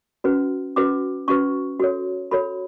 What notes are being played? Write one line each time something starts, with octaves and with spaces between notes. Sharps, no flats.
C#4 F#4 B4
C#4 F#4 B4 D6
C#4 F#4 B4 C#6
F#4 A4 C#5
F#4 A4 C#5 B5